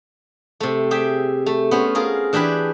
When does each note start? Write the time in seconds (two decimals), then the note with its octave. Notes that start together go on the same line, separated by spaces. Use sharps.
0.60 C3 A3
0.91 G4 G#4 E5 G5
1.46 A3
1.71 B3 C#4 C5
1.95 F4 G#4 A#4
2.33 E3 D4 G4 G#4 B4